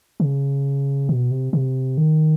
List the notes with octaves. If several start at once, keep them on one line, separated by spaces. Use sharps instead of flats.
C#3
B2
C3
C3
D#3